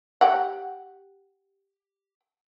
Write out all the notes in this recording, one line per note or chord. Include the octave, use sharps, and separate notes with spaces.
G4 F#5